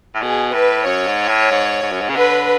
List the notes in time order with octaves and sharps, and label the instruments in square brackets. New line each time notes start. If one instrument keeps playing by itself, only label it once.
[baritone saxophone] A2
[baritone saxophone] B2 [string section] G#4
[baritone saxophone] A2 [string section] B4
[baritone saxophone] F#2 [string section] C#5
[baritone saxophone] G#2
A2
G#2
G#2
F#2
G#2
C#3
[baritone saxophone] D3 [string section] B4